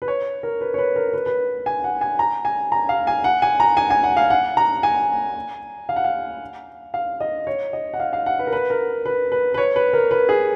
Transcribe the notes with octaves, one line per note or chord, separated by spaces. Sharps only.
B4
C#5
A#4
B4
C#5
B4
A#4
B4
B4
G#5
F#5
G#5
A#5
G#5
A#5
F5
G#5
F#5
G#5
A#5
G#5
G#5
F#5
F5
F#5
A#5
G#5
F5
F#5
F5
F5
D#5
C#5
D#5
F#5
F5
F5
F#5
B4
A#4
B4
A#4
B4
B4
B4
C#5
B4
A#4
B4
G#4